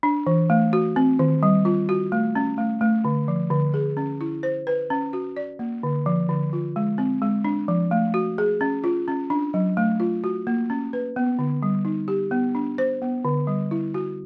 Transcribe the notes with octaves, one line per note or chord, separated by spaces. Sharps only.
D4
E3
A3
F#4
C4
D#3
G3
F4
F#4
A3
C#4
A3
A3
D3
F3
D3
G#4
C#4
E4
C5
B4
C#4
F#4
D5
A#3
D3
F3
D3
F4
G#3
C4
G#3
D4
F3
A3
F#4
G#4
C#4
F4
C#4
D4
F#3
A3
F4
F#4
A#3
C#4
B4
B3
D3
G3
D#4
G4
B3
D4
C5
B3
D3
G3
E4
F#4